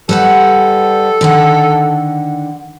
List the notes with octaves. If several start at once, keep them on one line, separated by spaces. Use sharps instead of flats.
G3 A4 B4 F#5
D3 D#3 F#5